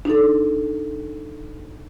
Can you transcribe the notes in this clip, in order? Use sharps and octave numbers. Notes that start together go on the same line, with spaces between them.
D4 D#4 A4